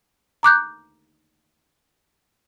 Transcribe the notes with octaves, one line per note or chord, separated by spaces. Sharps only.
A#5 D6 F#6 G6